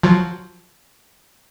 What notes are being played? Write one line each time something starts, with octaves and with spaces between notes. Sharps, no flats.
F3 F#3